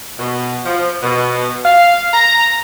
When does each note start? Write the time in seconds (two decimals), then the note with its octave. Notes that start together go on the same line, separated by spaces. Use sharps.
0.19 B2
0.65 F3
1.03 B2
1.65 F5
2.14 A#5